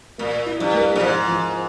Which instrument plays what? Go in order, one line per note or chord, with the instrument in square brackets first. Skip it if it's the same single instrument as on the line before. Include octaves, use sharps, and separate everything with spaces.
[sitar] A#2 [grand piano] A#3
[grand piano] E4
[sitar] G2
[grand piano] A#3
[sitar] A#2
[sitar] G#2 [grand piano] F3
[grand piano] F3